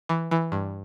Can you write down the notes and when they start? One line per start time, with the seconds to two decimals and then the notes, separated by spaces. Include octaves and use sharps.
0.09 E3
0.31 E3
0.52 G2